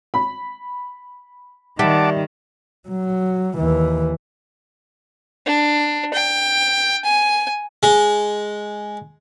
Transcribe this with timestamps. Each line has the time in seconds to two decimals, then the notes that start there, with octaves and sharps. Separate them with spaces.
0.14 B5
1.79 D#3 G3 E5 F#5 A5 D6
2.89 F#3
3.57 D#2 E3
5.46 D4
6.14 G5
7.05 G#5
7.83 G#3